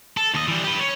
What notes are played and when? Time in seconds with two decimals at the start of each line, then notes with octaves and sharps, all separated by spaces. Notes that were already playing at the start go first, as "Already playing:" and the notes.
0.17 A4
0.34 D#2 D#5
0.48 E3 G3
0.64 G4 B4
0.80 C#4